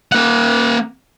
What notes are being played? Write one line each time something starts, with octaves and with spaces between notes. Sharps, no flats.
A#3 F#5